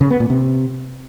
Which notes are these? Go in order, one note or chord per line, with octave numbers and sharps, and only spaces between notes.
C#3
B3
A#2
C3